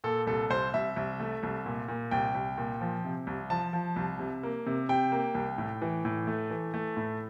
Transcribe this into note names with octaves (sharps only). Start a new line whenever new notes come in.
A#2 A4
C2 A4
C2 C5
C2 E5
C2
A3
C2
A#2
A#2
C2 G5
C2
A#2
F3
C3
C2
F3 A5
F3
C2
C3
A#3
C3
C3 G5
A#3
C2
A2
E3
A2
A3
E3
A3
A2